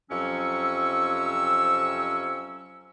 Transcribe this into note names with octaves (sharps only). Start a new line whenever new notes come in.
F2 C3 F#3 C#4 C#6 E6